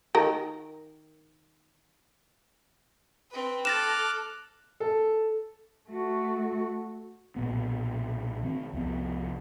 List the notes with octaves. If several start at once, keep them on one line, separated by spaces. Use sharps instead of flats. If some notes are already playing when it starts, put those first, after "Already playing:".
D#3 A#4
C4 B4
A4 D6 F6 F#6 A6 A#6 E7
A4
A3 F#4
B1 A#2 B3
D#3 C4
C2 F2 B3